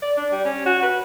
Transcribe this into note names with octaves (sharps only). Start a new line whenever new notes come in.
D5
D4
G3
C#4
F#4
B4